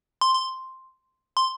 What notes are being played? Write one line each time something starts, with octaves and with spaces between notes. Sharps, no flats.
C6
C6
C6